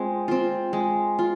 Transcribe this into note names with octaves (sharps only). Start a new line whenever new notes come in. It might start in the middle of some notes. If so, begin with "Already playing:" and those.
Already playing: G#3 C4 F4
C4 F4
G#3
F4